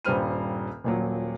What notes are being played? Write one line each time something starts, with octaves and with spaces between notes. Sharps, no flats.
D#1 G2 G3 C5 F6 D#7
D#1 A#2 F#3